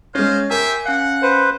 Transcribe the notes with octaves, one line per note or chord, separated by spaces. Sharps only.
G#3 C#4 C5 C#5 D#5 F5
G4 A#4 C5 E5 G#5
C#4 F5 F#5
B4 C5